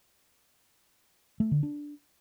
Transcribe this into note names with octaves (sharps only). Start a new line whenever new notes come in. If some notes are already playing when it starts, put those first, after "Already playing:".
A3
D3
D4